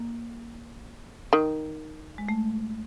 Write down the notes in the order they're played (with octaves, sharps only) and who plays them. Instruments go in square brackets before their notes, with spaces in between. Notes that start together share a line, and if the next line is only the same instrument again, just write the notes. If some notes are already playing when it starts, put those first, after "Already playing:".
Already playing: [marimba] A#3
[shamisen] D#3
[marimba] G#3
A3